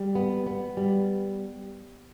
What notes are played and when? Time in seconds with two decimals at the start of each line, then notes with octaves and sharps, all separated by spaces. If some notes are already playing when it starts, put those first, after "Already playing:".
Already playing: G3
0.15 B3
0.47 B3
0.77 G3